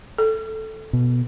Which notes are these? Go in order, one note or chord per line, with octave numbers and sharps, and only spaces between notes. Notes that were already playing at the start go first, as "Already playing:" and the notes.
A4
B2